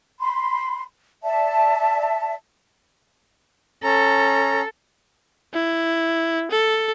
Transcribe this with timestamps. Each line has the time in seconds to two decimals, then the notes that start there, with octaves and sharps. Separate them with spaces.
0.20 B5 C6
1.23 D5 E5 A5
3.84 C#4 A4 A#5
5.54 E4
6.51 A4